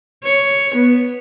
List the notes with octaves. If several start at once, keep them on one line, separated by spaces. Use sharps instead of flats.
C#5
B3